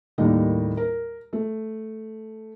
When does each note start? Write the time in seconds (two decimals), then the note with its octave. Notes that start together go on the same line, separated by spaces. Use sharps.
0.18 D#2 A2 G3 A#3 D#4
0.77 A#4
1.33 A3